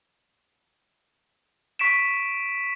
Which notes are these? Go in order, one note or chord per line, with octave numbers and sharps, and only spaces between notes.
C#6 B6 D7 E7